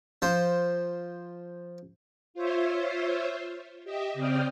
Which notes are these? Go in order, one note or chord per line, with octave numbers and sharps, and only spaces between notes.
F3 C5
F4 C5 C#5 E5
G4 D#5 E5
C#3 C4 D5 G5 D#6 F6